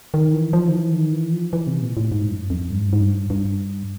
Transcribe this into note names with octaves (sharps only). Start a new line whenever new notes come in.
D#3
E3
F3
D#3
E3
D#3
E3
F3
E3
C3
A#2
A2
G#2
F#2
F2
G2
G#2
G2
G#2
G2
G2